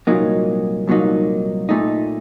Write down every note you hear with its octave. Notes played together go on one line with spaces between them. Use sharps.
C2 A#2 F#3 A#3 D#4
C2 A#2 F#3 A#3 D#4
A#2 A3 D#4